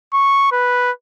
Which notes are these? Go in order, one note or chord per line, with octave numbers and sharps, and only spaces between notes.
C#6
B4